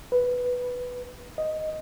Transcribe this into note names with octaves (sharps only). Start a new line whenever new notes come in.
B4
D#5